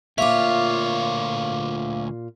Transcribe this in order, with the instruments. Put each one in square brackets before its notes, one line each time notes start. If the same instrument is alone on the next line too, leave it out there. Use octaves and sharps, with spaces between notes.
[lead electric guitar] D2 C#5 [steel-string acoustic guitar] A#2 F4 [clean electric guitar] E5 [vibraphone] F5 D6